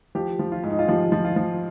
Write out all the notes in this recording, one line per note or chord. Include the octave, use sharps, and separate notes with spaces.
F3 G4
F3
F4
G#2
D#4
F4
F3 G4
F3
F4
F3